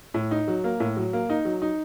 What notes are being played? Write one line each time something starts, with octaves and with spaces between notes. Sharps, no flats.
A2
D#4
F#3
A#3
A2
F#3
A#3
D#4
F#3
D#4